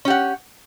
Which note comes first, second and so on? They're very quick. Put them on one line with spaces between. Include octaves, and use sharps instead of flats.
C#4 G4 F#5